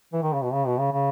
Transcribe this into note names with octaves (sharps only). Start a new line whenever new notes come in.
E3
D#3
C#3
B2
C#3
B2
C#3
C#3